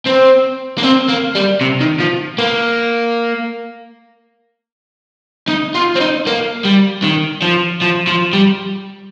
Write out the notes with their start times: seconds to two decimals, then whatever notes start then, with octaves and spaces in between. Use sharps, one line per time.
0.06 C4
0.78 A#3
0.83 C4
1.09 A#3
1.35 G3
1.61 C3
1.80 D#3
2.00 F3
2.38 A#3
5.49 D#4
5.75 F4
5.96 C4
6.01 D#4
6.27 A#3
6.65 G3
7.04 D#3
7.42 F3
7.82 F3
8.07 F3
8.33 G3